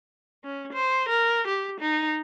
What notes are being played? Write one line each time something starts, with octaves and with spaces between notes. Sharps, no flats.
C#4
C5
A#4
G4
D#4